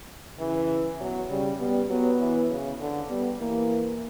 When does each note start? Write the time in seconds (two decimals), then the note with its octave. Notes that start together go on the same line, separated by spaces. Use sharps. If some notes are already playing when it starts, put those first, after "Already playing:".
0.39 C#3 E3
1.00 B2 F#3
1.30 C#3 G3
1.60 G3 B3
1.89 F#3 B3
2.19 E3
2.50 C#3
2.79 D3
3.10 G3 B3
3.40 E3 A#3